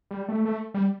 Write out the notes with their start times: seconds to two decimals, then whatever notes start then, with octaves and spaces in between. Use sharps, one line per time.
0.11 G3
0.29 A3
0.45 A3
0.74 G3